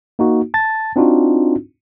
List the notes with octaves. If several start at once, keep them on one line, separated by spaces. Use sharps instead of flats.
A#3 D#4 F#4
A5 A6
C4 D4 D#4 F4 F#4